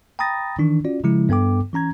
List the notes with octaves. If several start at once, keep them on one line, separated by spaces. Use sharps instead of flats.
G5 A#5 B5 D#6 A6 A#6
D#3 E3 D4
C#4 F4 F#4 D5
C#3 F3 G#3 E4
G2 B3 A4 G5 D6
E3 C#4 A#5 G#6